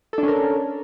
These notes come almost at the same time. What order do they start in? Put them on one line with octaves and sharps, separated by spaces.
A4 D4 C#4 A#4